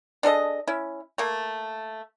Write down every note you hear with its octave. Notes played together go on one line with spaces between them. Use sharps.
D4 G#4 A4 D#5
C#4 E4
A3 A#3